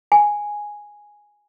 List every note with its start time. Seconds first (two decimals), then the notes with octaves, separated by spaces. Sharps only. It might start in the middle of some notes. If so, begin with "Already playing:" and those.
0.12 G#5